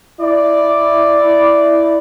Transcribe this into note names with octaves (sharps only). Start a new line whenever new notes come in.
E4 D5